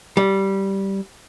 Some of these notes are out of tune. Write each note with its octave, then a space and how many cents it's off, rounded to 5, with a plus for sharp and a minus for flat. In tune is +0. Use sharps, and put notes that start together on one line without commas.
G3 -10